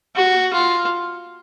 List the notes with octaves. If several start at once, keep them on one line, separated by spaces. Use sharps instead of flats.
F#4
F4